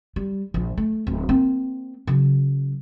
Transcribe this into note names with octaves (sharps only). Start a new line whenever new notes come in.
G3
A#1 F3
A3
D1
A#3 C4
C#3 F#3